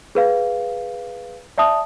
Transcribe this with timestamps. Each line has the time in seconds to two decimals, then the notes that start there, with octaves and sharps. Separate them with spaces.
0.15 G#4 B4 F5
1.58 D5 E5 A5 D#6